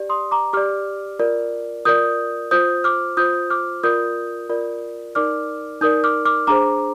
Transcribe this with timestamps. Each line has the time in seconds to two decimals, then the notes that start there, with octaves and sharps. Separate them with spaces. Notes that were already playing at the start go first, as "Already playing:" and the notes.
Already playing: G4 D5
0.10 C6 D#6
0.31 A#5 D6
0.53 G4 D5 D6 F6
1.19 F4 A#4 D5
1.85 F4 A#4 D5 D#6 G6
2.51 F4 C5 D#6 G6
2.84 D6 F6
3.17 F4 C5 D#6 G6
3.50 D6 F6
3.83 F4 A#4 D5 D#6 G6
4.50 F4 A#4 D5
5.15 D#4 A#4 D5 D6 F6
5.81 D#4 A#4 D5 D#6 G6
6.04 D6 F6
6.26 D6 F6
6.47 D4 G#4 C5 A#5 D6